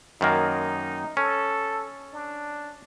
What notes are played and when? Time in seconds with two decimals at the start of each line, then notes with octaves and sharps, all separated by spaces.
0.21 F#2 D#3 A#3 D#4
1.17 C#4 A4
2.13 D4